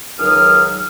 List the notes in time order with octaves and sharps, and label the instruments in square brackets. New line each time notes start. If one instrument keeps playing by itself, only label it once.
[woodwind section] C#2 D#3 F#3 D#6 F6